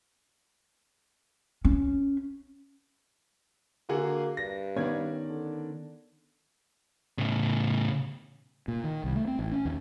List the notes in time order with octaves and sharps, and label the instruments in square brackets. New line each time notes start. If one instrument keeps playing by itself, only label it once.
[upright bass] C#4
[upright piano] D3 F#4 G#4 [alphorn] A#3
[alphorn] G2 [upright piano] A#6
[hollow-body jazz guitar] D#3 B3 C#4 [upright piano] D5 G#6
[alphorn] D3
[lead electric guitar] A2 C#3
[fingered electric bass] A#2
D#3
C2
A3
C4
A1
C#4
D#2